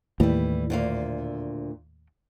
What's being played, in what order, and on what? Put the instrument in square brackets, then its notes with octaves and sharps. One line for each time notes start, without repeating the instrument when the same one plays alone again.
[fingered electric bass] D#2 A2 [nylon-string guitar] E3 G3
[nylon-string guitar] D2 A#2 F5